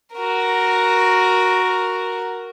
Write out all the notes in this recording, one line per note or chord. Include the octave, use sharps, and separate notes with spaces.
F#4 A#4